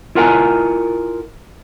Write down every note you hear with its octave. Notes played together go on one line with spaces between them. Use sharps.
E4 F4 A#4 F#5 G#5 A#5